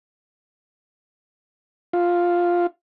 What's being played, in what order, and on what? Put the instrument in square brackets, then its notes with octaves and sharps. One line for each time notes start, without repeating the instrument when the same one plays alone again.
[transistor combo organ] F4